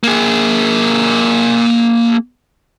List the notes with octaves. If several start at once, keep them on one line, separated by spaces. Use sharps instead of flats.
A#3 G#4